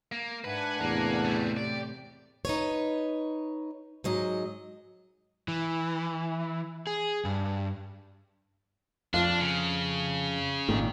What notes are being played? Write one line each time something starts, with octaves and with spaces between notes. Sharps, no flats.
A#3
G#2 D4 B4 E5 F#5 G#5
E2 A2 C3 A#3
G3 A3
G4 D5
D#4 B4 C#5
G#2 F#3 D#5
E3
G#4
G2
F2 D4 F4
C#3
G#1 A#2 D#3